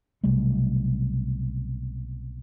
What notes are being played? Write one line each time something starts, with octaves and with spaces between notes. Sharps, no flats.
B1 C3 G3 A3